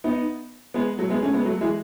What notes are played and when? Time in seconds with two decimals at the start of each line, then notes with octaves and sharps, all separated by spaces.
0.04 B3 D#4
0.74 G#3 B3
0.98 F#3 A3
1.10 G#3 B3
1.23 A3 C#4
1.33 G#3 B3
1.45 F#3 A3
1.61 E3 G#3